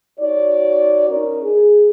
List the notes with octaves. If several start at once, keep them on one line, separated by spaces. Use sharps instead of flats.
D#4 F#4 C#5 D5
C#4 D#4 A#4
G#4